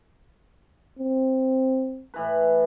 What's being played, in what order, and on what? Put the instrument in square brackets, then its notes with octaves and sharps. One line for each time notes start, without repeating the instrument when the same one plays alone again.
[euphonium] C4
[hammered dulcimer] A2 E3 B4